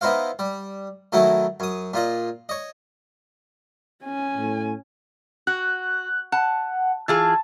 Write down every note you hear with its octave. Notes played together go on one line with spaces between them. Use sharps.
B3 D#4 E4 C5 F5
G3
D#3 F#3 A3 D#4 E4
F#2 D#6
A#2 F4 D#5
C#5 D#5
C#4 G#5
A2
F#4 F#6
F#5 A5
E3 F4 G#4 A5